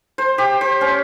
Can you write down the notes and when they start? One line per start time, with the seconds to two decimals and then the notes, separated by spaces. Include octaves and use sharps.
0.18 C5
0.38 G4
0.61 C5
0.81 C#4